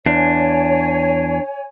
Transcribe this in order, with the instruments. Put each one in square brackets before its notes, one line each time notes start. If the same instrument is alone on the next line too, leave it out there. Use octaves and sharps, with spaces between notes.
[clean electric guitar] E2 [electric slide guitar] D4 [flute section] C#5 G#5